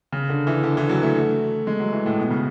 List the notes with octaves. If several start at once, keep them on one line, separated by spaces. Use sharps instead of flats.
C#3
D3
E3
D3
E3
F#3
A3
G#3
F#3
E3
A2
B2
C#3